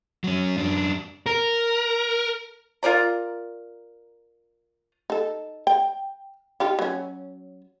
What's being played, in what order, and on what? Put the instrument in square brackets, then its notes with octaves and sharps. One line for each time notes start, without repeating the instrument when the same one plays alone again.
[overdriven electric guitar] F#3 C#4
F#2 D4
[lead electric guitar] A#4
[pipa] F4 A#4 D5 A#5
[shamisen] D#4 A4
G5
D#4 F4 G4
F#3 C#4